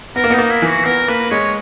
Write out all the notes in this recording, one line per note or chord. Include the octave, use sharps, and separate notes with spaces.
B3 A#4
A#3
B3 D#4
A#3
E4
E3
F#4
B3 A#4
A#3 B4
G#3 C#5